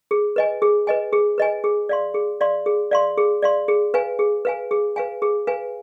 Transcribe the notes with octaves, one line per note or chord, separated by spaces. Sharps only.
G#4
B4 D#5 G#5
G#4
B4 D#5 G#5
G#4
B4 D#5 G#5
G#4
D5 F5 C6
G#4
D5 F5 C6
G#4
D5 F5 C6
G#4
D5 F5 C6
G#4
B4 F5 G#5
G#4
B4 F5 G#5
G#4
B4 F5 G#5
G#4
B4 F5 G#5